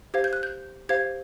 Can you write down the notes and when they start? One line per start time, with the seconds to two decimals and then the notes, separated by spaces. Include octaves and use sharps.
0.14 G4 C5 F5 G#6
0.24 G6
0.33 F#6
0.43 G6
0.89 G4 C5 F5 G#6